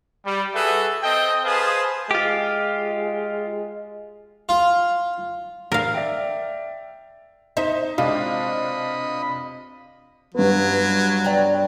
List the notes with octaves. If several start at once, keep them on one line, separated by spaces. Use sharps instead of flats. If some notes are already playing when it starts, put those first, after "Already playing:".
G3
F#4 G#4 A4 B4 E5
C4 A4 D#5 G5
G#4 B4 C5 F5 A5 D#6
G#3 F4 G4
F4
A#4 F5
D5 E5 G5
D#4 C5 E5
C3 G#3 D4 F4 D#5 B5
G2 F#3 B3
D5 G5 A#5